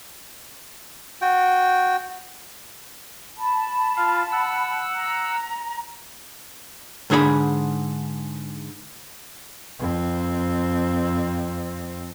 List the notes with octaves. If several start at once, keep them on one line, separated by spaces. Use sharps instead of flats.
F#4 G5
A5 B5
F4 F5
F#5 E6
A#5
G#2 D3 G#4 C5 B5
F2 C4